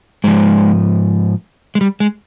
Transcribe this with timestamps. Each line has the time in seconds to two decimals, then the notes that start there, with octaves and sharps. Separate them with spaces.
0.24 G#2 F3 G#3
1.75 G#3
1.81 G3
2.00 G#3